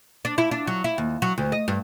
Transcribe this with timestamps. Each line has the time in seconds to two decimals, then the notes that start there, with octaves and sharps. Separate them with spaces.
0.25 D4
0.38 E4
0.51 D4
0.67 F#3
0.84 E4
0.98 D#2
1.22 F#3
1.38 D2
1.52 D#5
1.68 G2